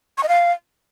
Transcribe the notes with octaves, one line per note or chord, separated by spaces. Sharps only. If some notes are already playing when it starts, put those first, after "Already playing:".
C#6
D#5
F5